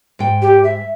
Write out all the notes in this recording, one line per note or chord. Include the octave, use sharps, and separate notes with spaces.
G#2 G5
G4
E5